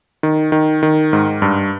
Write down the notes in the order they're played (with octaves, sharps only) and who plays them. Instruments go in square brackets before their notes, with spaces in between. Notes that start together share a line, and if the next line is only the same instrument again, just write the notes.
[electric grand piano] D#3
D#3
D#3
G#2
G2